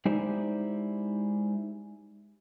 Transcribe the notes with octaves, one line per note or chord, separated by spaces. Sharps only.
G#3 D#4 E4 G4 C5 D5